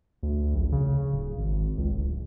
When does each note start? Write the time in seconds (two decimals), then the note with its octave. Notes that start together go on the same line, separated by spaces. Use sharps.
0.23 D2
0.55 A#1
0.72 C#3
1.12 D1
1.38 G#1
1.78 C#2
1.92 D1